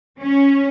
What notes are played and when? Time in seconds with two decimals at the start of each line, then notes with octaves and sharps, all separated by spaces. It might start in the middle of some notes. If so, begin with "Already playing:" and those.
0.20 C#4